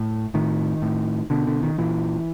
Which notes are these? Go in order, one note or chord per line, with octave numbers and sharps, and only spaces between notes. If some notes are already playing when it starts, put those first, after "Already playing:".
Already playing: A2
A2 D#3
A2
B2 D3
D3
D#3
A#2 E3